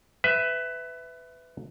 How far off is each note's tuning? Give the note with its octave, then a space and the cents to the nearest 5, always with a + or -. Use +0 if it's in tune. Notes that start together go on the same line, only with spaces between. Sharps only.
B4 +20 E5 +0